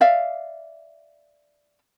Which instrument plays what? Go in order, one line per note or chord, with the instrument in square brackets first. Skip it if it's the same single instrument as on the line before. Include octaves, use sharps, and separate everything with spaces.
[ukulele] D5 E5 F5